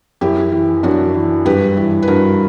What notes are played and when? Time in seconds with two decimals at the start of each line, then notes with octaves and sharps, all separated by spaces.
0.21 F#2 E4 G4
0.52 E3
0.83 F#2 D4 F#4
1.14 E3
1.45 G2 G4 B4
1.77 E3
2.02 B4
2.08 G2 F#4 A#4